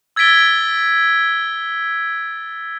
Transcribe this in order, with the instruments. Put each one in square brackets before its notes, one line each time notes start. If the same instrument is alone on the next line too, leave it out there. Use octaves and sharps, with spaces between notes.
[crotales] E6 G#6 A6 B6 D7 G7